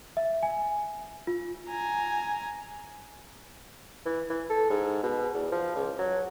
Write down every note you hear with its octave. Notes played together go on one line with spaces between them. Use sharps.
E5
G#5
F4
G#5 A#5
E3
E3
A4
G#2
B2
E2
F3
C#2
F#3